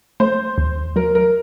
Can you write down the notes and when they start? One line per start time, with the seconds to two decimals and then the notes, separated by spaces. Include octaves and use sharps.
0.20 A3 C5
0.58 D#2
0.96 F#3 A#4
1.15 A#4